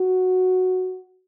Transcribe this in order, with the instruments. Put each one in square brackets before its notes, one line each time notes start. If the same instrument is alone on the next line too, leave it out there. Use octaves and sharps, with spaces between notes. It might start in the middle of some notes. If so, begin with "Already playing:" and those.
Already playing: [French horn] F#4